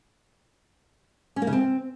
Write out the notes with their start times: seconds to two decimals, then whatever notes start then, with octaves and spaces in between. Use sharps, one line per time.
1.36 C#4
1.42 A#3
1.47 C#3
1.53 C4